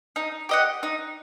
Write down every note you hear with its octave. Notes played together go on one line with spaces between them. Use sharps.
D#4
G4 D#5 F#5
D#4